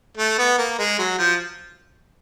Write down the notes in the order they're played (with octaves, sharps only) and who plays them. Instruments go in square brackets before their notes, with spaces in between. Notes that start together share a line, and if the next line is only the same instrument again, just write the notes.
[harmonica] A3
B3
A#3
G#3
F#3
F3